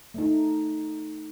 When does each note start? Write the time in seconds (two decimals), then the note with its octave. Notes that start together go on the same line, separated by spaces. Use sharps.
0.14 A3 D#4